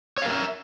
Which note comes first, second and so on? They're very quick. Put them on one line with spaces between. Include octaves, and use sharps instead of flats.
C#5 F5 A#4 E5